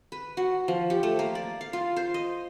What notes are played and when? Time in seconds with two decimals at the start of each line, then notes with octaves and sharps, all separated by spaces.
0.12 B4
0.37 F#4
0.68 F3
0.90 G4
1.03 A3
1.19 A#3
1.35 D5
1.61 F5
1.73 F4
1.96 C5
2.14 D#5